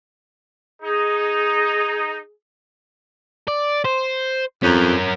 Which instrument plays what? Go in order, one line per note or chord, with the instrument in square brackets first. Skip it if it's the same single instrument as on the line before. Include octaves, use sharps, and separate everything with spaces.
[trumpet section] D#4 [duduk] G#4
[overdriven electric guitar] D5
C5
[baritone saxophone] F2 [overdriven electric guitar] C#4 A#4